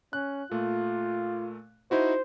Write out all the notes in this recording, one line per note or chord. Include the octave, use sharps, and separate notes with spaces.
C#4 F#6
A#2 A3 F4
D#4 E4 F#4 C5